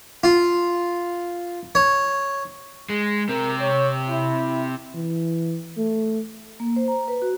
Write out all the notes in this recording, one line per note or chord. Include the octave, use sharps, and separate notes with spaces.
F4
C#5
G#3
C3 C4 A#4
C#5
E4
E3
A3
A#3
C5
A#5
B4
F#4